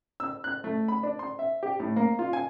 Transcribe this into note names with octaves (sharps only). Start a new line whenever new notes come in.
E6
F#6
A3
B5
D4
C6
E5
G4
A2
A#3
F4
G#5